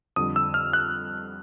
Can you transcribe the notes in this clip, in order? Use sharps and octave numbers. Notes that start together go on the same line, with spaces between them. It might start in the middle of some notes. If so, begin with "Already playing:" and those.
F2 D3 G3 D#6
E6
F6
F#6